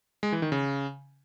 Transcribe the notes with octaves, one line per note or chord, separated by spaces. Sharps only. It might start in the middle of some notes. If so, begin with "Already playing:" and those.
G#3
E3
D#3
C#3